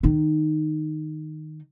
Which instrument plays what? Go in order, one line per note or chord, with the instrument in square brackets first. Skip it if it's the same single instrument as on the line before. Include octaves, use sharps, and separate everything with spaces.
[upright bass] D#3 D#4